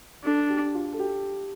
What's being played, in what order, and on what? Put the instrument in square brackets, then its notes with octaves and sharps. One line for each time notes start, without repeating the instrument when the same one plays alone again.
[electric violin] D4 [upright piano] A4
[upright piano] G4
F4
A4
G4